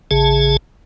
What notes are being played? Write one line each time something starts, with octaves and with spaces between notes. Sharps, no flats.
A1 C#3 G#4 A5